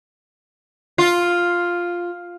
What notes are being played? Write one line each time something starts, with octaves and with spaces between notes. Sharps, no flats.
F4